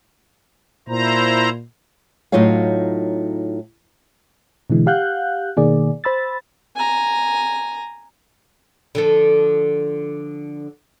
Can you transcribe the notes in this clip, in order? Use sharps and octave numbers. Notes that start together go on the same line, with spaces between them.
A#2 E4 C5 A#5
A2 F#3 D#4 F4 C#5 F5
B2 D3 E3 G#3
G4 F5 F#5 F#6 G6
B2 D#3 A#3 G#4 D5
C5 B5 E6 A6
G#5 A#5
D3 F3 A4